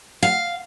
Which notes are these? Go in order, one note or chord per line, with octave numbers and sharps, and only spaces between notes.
F5